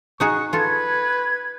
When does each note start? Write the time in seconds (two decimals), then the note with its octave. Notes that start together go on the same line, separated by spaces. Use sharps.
0.20 D#4 F#4 G#4 C#6
0.53 F4 A4 B4 G#6